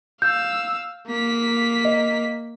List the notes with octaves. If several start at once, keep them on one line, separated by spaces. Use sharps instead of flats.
F5 E6 G6
A#3 B6
D#5